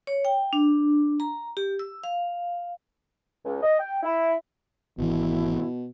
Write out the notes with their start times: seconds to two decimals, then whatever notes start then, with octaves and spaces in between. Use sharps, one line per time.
0.07 C#5
0.25 G5
0.53 D4
1.20 A#5
1.57 G4
1.79 E6
2.04 F5
3.45 C#2
3.62 D#5
3.80 G5
4.03 E4
4.98 G#1 B2 E3 E4